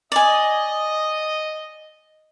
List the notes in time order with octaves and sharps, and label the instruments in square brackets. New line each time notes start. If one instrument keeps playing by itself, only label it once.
[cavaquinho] D5 G#5 [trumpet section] D#5